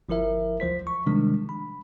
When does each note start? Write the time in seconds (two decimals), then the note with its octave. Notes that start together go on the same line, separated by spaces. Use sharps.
0.09 G1 F3 E4 A#4 E5
0.60 D2 F3 C5 B6
0.87 C#6
1.06 C3 D#3 F3 G3 G#3 D4
1.49 B5